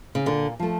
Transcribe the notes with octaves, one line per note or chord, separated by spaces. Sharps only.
C#3
A#2 D3
F3 A3